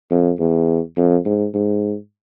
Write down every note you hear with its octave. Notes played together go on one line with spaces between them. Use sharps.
F2
E2
F2
G#2
G#2